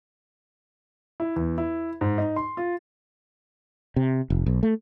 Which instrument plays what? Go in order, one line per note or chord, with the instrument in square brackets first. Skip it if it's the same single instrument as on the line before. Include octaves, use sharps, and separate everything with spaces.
[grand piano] E4
E2
E4
G#2
D#4
C6
F4
[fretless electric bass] C3
F1
B1
A3